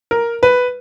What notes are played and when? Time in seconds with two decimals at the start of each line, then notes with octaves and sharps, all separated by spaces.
0.11 A#4
0.43 B4